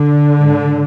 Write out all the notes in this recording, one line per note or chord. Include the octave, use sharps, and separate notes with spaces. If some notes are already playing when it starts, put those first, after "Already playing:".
Already playing: D3
G#2